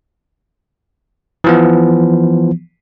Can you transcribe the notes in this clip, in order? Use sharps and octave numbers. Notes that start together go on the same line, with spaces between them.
E3 F3 B3